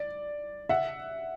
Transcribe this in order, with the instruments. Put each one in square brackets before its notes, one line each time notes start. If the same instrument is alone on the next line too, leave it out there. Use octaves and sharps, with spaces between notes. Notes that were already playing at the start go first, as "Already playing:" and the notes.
Already playing: [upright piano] D5
E5 F#5